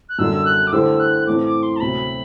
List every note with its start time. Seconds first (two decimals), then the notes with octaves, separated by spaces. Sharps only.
0.09 F#6
0.19 F#2 D3 G3 D4 E6
0.45 F#6
0.67 D6
0.72 D3 A3 E4 G4 C5 E6
1.00 F#6
1.27 A2 E3 A3 C4 D6
1.44 D6
1.63 C6
1.76 A5
1.81 D2 C3 F#3 B5